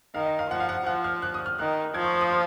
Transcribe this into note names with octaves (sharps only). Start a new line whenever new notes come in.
D#3 F5
D#5
F5
F3 F#5
F5
F#5
F3 F#5
F6
F#6
D#6
F6
D#3 F#6
F3 G#6
C#6
C6
D#6
F6